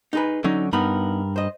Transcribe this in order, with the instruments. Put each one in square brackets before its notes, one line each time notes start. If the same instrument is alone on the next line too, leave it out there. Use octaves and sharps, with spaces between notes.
[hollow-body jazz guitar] D#4 G#4 B4
[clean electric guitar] D3 F#3 C#4 [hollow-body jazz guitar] D#4
[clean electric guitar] G2 A#4 B5 [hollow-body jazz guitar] B3 D#4
[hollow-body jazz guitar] C5 D#5